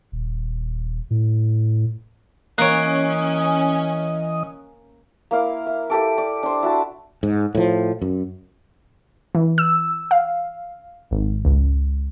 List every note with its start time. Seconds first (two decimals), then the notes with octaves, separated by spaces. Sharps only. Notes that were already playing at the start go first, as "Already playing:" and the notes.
0.12 D#1
1.10 A2
2.58 E3 A#3 C#4 C#5 D#5 D#6 F#6 D7
5.31 A#3 E4 F5
5.66 E5
5.90 E4 G4 A4 D6
6.18 D5
6.43 D4 C5
6.63 E4 F#4 A5
7.23 G#2
7.55 A2 F3
8.02 F#2
9.35 E3
9.58 E6
10.11 F5
11.11 G#1
11.45 C#2